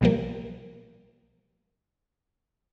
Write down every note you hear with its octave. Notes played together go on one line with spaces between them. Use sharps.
B1 B2 F3 G3 A#3